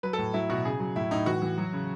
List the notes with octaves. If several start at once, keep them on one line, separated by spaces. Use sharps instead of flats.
F#3 B4
A4
A2
F#3 E4
B2 F#4
C#3 G#4
F#3
A2 E4
A2 D#4
E3 F#4
E3
F#3
C#3